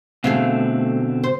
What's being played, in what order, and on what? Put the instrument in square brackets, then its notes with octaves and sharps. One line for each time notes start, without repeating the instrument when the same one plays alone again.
[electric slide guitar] B2 D3 C4 [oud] A3 G#4 F5
[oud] C5